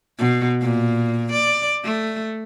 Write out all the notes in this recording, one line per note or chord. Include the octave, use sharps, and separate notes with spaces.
B2
A#2
D5
A3